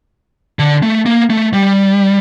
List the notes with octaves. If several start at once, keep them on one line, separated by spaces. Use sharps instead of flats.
D3
A3
A#3
A3
G3